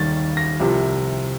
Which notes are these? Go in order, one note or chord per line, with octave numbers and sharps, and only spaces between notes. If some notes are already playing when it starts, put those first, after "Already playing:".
Already playing: D#2 D#3 G3 A6
A#6
C2 C3 F3